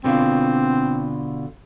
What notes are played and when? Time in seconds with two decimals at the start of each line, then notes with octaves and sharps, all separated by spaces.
0.04 B2 D3 C4 F4